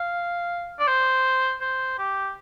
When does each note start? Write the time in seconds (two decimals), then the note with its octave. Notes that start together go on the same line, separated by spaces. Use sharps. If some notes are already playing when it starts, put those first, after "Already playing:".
Already playing: F5
0.79 D5
0.87 C5
1.61 C5
1.98 G4